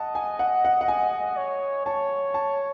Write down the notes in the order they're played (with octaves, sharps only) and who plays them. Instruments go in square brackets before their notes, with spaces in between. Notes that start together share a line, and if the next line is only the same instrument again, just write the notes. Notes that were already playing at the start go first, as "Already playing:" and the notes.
Already playing: [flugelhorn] D#5 [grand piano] F#5 A5
[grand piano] G#5
F#5
F#5
F#5
G#5
[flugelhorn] C#5
[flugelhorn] C#5 [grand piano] A5
[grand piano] A5